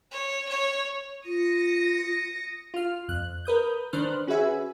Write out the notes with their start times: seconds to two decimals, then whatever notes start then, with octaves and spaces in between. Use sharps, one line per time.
0.12 C#5
0.49 C#5
1.25 F4 D#6 A#6 C#7
2.74 F4 F6
3.08 F2 F#6
3.45 A#4 B4 D#6 G6
3.93 D#3 D4 B4 C5 F6 F#6
4.27 C#4 F#4 G#4 B4 E5 G#5